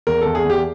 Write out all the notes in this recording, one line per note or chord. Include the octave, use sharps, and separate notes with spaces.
E2 A#4
E2 A4
G#4
E2
G4